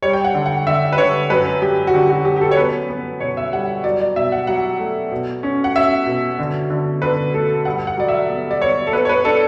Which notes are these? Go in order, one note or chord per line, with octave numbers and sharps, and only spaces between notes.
G3 C#5
G5
F#5
D3
F#5
D3 E5
B4
D3 C#5
F#2 B4
F#2 G4
F#4
D3 G4
F#4
F#2 G4
G4
A4
C#5
B3 B4
B3
B2 C#5
E5
G3 F#5
F#3 D5
D5
B2 E5
F#5
F#3 F#5
A3
B2
C#4
F#5
C#4 E5
B2
D3
D3
D3 B4
A3 A4
G2 F#5
F#5
F#3 D5
E5
B3
D5
B3 C#5
A4
B3 B4
C#5
B4
D4 A4